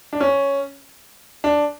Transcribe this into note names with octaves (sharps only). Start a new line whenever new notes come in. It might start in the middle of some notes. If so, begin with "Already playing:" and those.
D4
C#4
D4